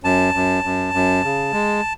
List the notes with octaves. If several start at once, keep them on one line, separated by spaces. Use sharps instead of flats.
F#2 A5
F#2
F#2
F#2
C#3
G#3